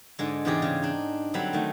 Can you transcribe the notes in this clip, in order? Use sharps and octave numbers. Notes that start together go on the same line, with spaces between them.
G#2 D3 G#3
E2 G#2 C3 G4 G#4 D5
C#3
D4 D#4
D3 F#3 G3 C4 B5
D#3 A3